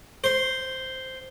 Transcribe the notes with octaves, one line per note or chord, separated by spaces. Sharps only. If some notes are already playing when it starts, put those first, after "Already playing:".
C5